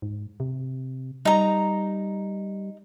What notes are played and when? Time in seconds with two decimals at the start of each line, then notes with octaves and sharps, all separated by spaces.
0.02 G#2
0.40 C3
1.25 G3 D#4 A#5